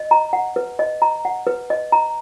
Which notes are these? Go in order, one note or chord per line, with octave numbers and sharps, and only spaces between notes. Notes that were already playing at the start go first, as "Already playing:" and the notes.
Already playing: D#5
A#5
F#5
B4
D#5
A#5
F#5
B4
D#5
A#5